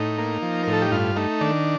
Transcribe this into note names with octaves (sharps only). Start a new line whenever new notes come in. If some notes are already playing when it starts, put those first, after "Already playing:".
Already playing: A2 D#4
A#3
F3
A2 A#4
A4
G4
G2 F4
A3 D#4
D#3 D4